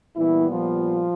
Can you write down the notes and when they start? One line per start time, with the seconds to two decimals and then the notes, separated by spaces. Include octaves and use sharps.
0.16 A#2 E3 G3 B3 E4
0.50 F3 F4